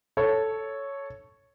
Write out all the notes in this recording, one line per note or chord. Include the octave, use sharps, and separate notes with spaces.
A4 C#5